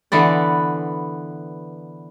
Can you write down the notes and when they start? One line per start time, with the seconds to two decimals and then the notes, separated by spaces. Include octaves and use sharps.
0.12 D3 E3 B3 D5